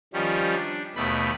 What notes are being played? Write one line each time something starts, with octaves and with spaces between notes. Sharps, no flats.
D#3 F3 G3 C#4
D4
D#2 B2 A3 B5